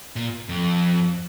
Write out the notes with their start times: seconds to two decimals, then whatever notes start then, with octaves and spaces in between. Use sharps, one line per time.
0.16 A#2
0.49 F2